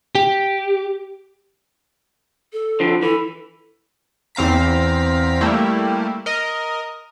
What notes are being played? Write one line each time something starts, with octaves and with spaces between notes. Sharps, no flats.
G4
A4
D3 F3
E3 A4
E2 C4 F5 A#5 B6
G3 A3 A#3 E4 G4
A#4 D#5